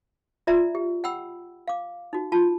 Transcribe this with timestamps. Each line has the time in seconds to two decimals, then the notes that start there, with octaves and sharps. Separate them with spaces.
0.47 F4 D5 E5 A#5
0.75 G4
1.04 F#5 G5 B5 E6
1.68 F5 D6
2.13 D#4 F#4
2.32 F4 A5